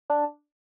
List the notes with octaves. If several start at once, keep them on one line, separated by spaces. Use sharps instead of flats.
D4